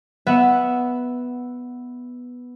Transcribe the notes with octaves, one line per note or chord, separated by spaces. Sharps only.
B3 E5 F#5